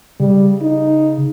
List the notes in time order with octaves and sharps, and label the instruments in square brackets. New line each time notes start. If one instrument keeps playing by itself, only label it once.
[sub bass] C#3 [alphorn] G3
[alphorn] D#4